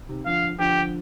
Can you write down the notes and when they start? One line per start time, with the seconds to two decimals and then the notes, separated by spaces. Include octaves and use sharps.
0.09 C3 D#3
0.26 D3 F3 F5
0.59 D3 F3 G4